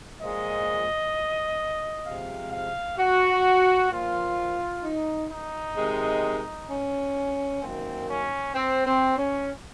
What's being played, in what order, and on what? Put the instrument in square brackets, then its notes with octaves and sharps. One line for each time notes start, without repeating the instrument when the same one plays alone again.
[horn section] A#2 F3 G#3 D#5
C3 F3 G#3 F5
F5
F#4
A#2 F3 A#3 F4
D#4
D#4
C3 D#3 G#3
C#4
F#2 D#3 A#3 C4
C#4
C4
C4
C#4